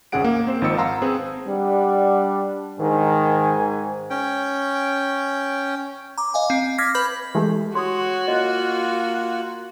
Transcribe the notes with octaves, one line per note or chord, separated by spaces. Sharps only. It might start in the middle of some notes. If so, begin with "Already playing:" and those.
G#1 C#2 C#4 G#4 F#5 D7
A#3
C4 C5
G#1 D#3 F3 D#5 E6 C#7
F5 F#5 A5 A#5 C6 E6
C4 G#4 B4
G3 D4 F#5
G#2 D#3 G#5
C#4 G5
A#5 D6
D#5 F5 G#5
C4
D6 F6 G#6 A#6 B6
B4 B5 G6
E3 G#3 A3 G4
F#4 C#5 C6 D#6
A#3 F4 D#5